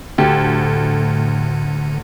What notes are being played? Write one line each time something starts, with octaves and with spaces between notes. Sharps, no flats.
D2 A2 D3 G4 A4